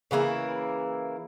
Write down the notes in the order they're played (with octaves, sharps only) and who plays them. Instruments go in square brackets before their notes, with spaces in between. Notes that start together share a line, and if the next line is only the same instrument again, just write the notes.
[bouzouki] C#3 E3 A#3 E4